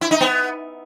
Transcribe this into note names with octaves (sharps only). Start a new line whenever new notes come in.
E4
D#4
B3